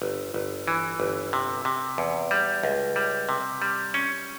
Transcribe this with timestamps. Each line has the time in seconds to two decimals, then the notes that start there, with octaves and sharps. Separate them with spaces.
0.02 G1
0.34 G1
0.68 E3
1.00 G1
1.33 C3
1.65 C3
1.98 E2
2.31 G3
2.63 C#2
2.96 G3
3.29 C3
3.62 G3
3.94 C#4